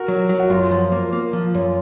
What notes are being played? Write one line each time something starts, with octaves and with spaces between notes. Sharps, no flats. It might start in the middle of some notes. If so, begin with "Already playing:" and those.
Already playing: F#4 A#4
F#3
F#3
F#4
F#2 F4
F3
A#3
A#3
F3
F#2